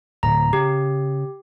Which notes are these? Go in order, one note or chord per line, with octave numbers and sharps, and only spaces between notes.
D1 D3 A#5
C#3 G4